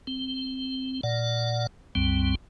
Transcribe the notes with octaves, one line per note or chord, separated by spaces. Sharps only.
C4
A#2 D5 F#5
C2 F#2 G3 C4